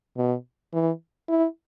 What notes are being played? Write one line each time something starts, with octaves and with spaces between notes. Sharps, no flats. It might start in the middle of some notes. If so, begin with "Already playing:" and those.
B2
E3
E4